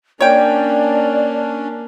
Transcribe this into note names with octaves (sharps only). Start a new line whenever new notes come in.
A#3 C#4 D4 C#5 D5 G5